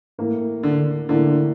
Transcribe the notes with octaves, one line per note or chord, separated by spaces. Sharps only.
A2 E3 A#3
D3
A2 D3 E3 A#3